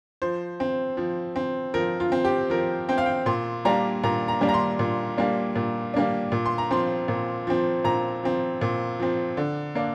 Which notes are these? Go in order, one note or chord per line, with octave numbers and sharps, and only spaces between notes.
F3 C5
C4
F3
C4
F3 A#4
F4
C4
G4
F3 A#4
C4 G5
F5
G5
A#2 C6
G3 A#3 D4 A#5
A#2 A#5
A#5
G3 A#3 D4
A#5
C6
A#2
G3 A#3 D4
A#2
G3 A#3 D4
A#2
C6
A#5
F3 C4 C6
A#2
F3 C4
A#2 A#5
F3 C4
A#2
F3 C4
D3
A#3 D4